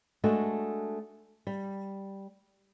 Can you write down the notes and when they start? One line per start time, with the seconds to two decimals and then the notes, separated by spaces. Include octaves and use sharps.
0.24 G#3 A3 D4 F#4 A4 D#5
1.47 G3